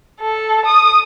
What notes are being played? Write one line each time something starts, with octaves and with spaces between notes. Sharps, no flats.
A4
D#6